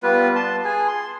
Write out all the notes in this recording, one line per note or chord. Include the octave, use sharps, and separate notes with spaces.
G3 B3 F4 B4
A5 C6
G#4 G#5
C6